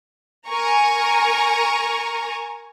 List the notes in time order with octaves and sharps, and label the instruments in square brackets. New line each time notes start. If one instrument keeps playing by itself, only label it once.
[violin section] A#4 G#5 A#5 C#6